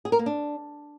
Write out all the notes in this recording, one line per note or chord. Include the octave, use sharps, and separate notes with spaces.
G#4
A#4
A#3
D4